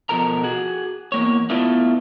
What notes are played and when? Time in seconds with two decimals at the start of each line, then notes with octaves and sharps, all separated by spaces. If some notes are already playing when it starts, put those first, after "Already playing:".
0.09 B2 F3 A4 A#4 A#5
0.43 F#4 G#4
1.12 E2 A#3 C#5
1.50 A3 B3 E4 F4 A4